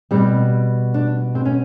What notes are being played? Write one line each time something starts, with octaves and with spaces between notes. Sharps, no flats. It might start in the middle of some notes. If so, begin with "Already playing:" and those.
B2 G3 C4
D4
C4
C#4